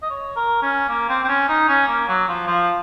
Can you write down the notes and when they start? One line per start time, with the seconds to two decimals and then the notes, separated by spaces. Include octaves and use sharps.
0.02 D#5
0.10 C#5
0.36 A#4
0.62 C#4
0.88 A#3
1.09 C4
1.24 C4
1.28 C#4
1.48 D#4
1.68 C#4
1.87 A#3
2.08 F#3
2.28 F3
2.47 F3